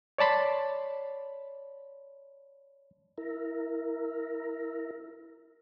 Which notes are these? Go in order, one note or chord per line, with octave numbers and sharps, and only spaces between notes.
C#5 D5 A5 B5 C6
E4 A#4